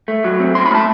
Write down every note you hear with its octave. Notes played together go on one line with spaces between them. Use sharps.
A3
F#3
C4
A2 C6
B5
A3 A5